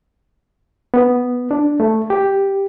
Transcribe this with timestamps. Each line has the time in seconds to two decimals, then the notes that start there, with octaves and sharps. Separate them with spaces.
0.94 B3
1.51 D4
1.80 A3
2.10 G4